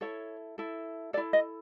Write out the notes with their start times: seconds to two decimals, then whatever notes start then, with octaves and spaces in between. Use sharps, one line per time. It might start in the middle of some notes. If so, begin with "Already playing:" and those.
0.01 E4 A4 C#5
0.58 E4 A4
1.13 A4 D5
1.17 E4
1.33 D#5